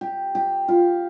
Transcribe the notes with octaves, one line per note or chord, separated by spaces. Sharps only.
G4
G4
F4